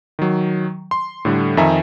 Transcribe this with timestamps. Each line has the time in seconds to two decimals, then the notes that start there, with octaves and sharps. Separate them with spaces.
0.19 D#3 F#3
0.91 C6
1.25 A2 D3 G3
1.57 F2 D#3 E5 G#5 A#5